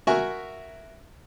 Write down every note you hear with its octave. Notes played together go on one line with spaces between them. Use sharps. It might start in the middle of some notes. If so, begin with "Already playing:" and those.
F#4 A#4 E5 G#5 C#6